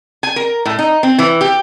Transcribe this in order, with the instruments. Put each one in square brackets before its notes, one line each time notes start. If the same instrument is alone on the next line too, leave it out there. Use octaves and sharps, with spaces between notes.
[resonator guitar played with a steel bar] G#5
A#4
A2
D#4
C4
E3
G4